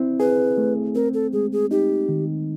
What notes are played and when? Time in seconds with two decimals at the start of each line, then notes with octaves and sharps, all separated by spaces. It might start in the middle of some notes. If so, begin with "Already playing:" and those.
Already playing: C4 E4
0.20 G#4 B4
0.58 A3
0.95 C4 A#4
1.14 A4
1.33 G#3 G#4
1.53 G#4
1.71 D#4 G4
2.09 D#3